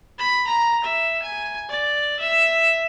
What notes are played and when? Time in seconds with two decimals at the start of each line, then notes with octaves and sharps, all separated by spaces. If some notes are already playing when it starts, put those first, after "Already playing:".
0.19 B5
0.47 A#5
0.84 E5
1.22 G#5
1.69 D5
2.19 E5